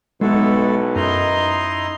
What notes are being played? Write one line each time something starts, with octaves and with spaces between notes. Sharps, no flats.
B1 G#3 B3 E4 F#4 A4
F#2 D#4 E4 D#5 A#5 C6